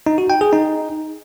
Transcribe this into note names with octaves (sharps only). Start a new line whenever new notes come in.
D#4
F#4
G5
G#4
D#4